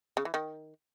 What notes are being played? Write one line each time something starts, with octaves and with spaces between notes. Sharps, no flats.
C#3
E3
D#3